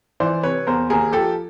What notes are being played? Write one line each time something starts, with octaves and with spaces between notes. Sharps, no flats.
E3 C5 D5
C3 B4 C#5
E2 A#4 C5
D#2 G#4 A#4
F3 G4 A4